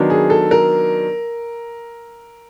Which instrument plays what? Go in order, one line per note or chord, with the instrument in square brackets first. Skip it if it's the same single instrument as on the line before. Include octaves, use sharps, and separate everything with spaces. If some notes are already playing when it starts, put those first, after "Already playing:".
Already playing: [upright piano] D#3 F#3 B3 D4
G#4
A4
A#4